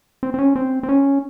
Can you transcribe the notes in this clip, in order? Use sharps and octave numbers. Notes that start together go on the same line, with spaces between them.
C4
C4
C#4
C4
C4
C#4